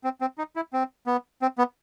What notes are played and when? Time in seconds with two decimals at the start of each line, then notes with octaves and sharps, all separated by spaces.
0.04 C4
0.21 C4
0.38 D#4
0.56 E4
0.73 C4
1.06 B3
1.42 C4
1.58 B3